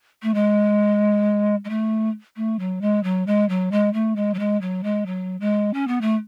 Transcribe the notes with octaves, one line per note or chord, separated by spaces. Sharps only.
A3
G#3
G#3
A3
A3
F#3
G#3
F#3
G#3
F#3
G#3
A3
G#3
F#3
G#3
F#3
G#3
F#3
G#3
C#4
B3
A3